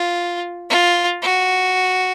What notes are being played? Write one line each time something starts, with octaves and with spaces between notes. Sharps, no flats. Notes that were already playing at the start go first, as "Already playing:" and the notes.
Already playing: F4
F4
F#4